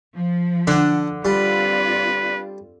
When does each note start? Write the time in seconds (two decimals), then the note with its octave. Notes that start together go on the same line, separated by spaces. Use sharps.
0.14 F3
0.67 D3 D4 F#5
1.25 G3 C4 F4 B4 D5